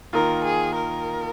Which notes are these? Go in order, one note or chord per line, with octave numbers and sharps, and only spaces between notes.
D#3 A#3 F4 A#4
G#4
A#4